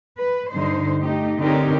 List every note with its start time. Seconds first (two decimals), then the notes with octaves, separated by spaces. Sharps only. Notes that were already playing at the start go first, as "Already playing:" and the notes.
0.17 B4
0.51 G2 D3 D#4 C5
0.98 A3 D#4 G4
1.40 D3 C4 D#4 G4 A#4 C#5